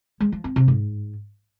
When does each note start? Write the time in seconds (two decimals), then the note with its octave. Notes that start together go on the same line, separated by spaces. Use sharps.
0.20 G#3
0.32 F3
0.44 C4
0.56 C3
0.68 G#2